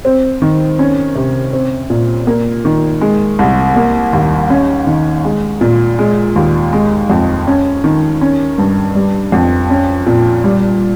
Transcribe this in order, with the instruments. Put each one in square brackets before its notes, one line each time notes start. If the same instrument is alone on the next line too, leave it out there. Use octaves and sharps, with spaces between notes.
[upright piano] C4
D#3
C#4
C3
C4
A#2
A#3
D#3
G#3
C2
A#3
D#2
C#4
D#3
G#3
A#2
G#3
D#2
G#3
F2
C#4
D#3
C#4
G2
G3
F2
C#4
A#2
G3